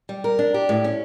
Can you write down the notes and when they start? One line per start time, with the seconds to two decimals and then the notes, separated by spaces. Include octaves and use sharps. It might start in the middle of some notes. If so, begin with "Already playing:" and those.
0.09 G3
0.24 A#4
0.39 D4
0.54 G4
0.69 A2
0.84 C#4